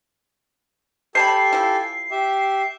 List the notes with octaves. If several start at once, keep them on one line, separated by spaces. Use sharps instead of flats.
G4 A4 C5 G#5 A5 B5 C7
F3 E4
G4 E5